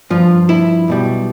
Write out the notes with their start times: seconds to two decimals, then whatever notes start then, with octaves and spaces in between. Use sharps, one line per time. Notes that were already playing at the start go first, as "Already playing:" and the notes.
0.10 G2 F3 F4
0.49 E4
0.88 B1 B2 G3